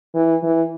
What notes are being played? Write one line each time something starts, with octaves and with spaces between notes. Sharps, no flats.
E3
E3